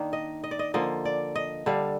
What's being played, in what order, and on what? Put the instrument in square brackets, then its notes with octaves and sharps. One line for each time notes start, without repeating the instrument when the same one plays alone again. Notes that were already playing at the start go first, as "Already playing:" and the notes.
Already playing: [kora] D#3 A#3 D4
D#5
D#5
D5
D#5
D3 F3 A#3 D#5
D5
D#5
D3 G3 D4 F5